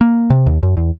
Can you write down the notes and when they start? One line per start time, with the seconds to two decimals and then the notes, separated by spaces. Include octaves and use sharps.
0.01 A#3
0.30 C3
0.46 D#2
0.63 F#2
0.77 E2